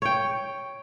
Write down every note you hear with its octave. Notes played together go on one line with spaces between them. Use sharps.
C#5 G5